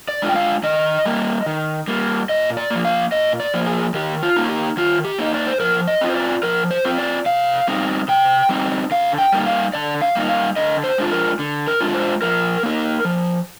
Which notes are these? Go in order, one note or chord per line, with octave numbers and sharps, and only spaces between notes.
D5
G#3 D4 F4
G5
F5
D#3 D#5
G3 A#3
D#3
G3 A#3
A#2 D#5
D5
F3 A#3
F5
A#2 D#5
D5
F3 A#3
G#4
D#3 G4
F4
A#3 D#4
G4
D#3 F4
G4
A#3 D#4 D#5
D5
C5
F3 A#4
D#5
C4 F4
C5
D5
F3 A#4
C5
C4 F4
D5
C3 F5
G3 C4 D#4
C3 G5
G3 C4 D#4
D3 F5
G5
G3 A#3 D#4
F5
D3 D5
F5
G3 A#3 D#4
F5
D3 D#5
C5
G#3 D4 F4
A#4
D3
A#4
G#3 D4 F4
C5
F3 A#4
A#3 D#4
F3